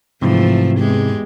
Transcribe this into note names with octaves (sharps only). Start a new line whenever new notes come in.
G#2 C3 E3 F3 A3
E2 G#3 G4